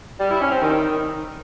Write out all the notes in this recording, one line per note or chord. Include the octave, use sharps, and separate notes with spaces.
G3
E4
C#4
C4
D#3